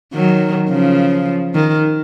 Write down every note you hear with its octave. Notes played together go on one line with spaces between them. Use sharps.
D#3 F#3
C#3 F3
D#3